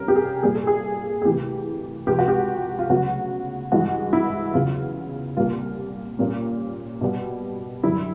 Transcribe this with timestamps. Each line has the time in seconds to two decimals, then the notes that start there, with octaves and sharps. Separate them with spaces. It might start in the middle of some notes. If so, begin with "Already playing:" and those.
Already playing: C3 G3 C#4 A#4
0.08 G4
0.16 G#4
0.43 A#2 G3 A#3 G#4
0.55 A4
0.67 G#4
1.22 G#4
1.25 D2 C3 E3 A3 G4
2.07 C#2 C3 F3 G#3 G4
2.19 F#4
2.28 G4
2.79 F4
2.89 D2 C#3 F#3 B3 F#4
3.72 G2 E3 G#3 F#4
4.13 E4
4.54 E2 C#3 F#3 B3 F4
5.37 C2 A#2 G3 A#3 F4
6.19 A#2 G3 A#3 C#4
7.01 B2 G3 B3
7.83 F#2 D3 G3 E4